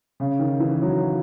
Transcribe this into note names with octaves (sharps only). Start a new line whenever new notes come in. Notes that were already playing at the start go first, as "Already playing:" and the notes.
C#3
D#3
E3
F#3